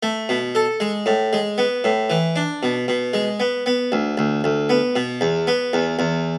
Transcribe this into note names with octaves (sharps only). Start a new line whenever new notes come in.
A3
B2
A4
G#3
A2
G#3
B3
A2
E3
D4
B2
B2
G#3
B3
B3
D2
D2
D2
B3
B2
E2
B3
E2
E2